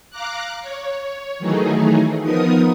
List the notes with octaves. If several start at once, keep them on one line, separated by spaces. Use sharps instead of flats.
F5 A#5 D6 F#6
C#5
D#3 E3 F#3 A3 D#4 G#4
F3 B3 D#4 A#4 D#6